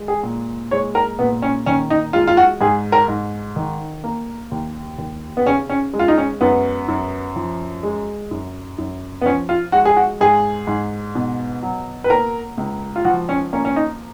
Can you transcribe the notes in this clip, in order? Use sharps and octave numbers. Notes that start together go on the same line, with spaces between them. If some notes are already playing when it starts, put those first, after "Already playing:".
Already playing: G#3
G#4
A#2
G#3 C#5
A#4
A#2 B3
C#4
D#3 C#4
D#4
G#3 F4
F4
F#4
G#2 G#4
A#4
G#2
D#3
A#3
D#2
D#2
B3
C#3 C#4
C#4
G#3
F4
D#4
C#4
F#2 B3
F#2
F3
G#3
F#2
F#2
B3
F3 C#4
F4
G#3 F#4
G#4
F#4
G#2 G#4
G#2
B2
F#3
B4
A#3 A#4
C#2
F4
F3 F#4
C#4
A#3 C#4
C#4
D#4